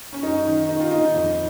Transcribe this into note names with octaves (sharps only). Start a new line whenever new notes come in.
C#4
F#2 D#4
D#3
D#3 D#4
F4
D#3 D#4
F2